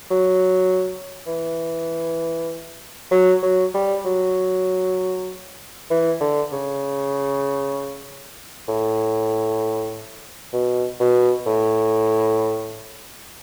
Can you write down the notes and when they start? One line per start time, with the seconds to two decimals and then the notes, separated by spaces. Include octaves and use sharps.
0.11 F#3
1.27 E3
3.11 F#3
3.42 F#3
3.74 G3
4.05 F#3
5.90 E3
6.21 D3
6.52 C#3
8.68 A2
10.53 B2
11.00 B2
11.46 A2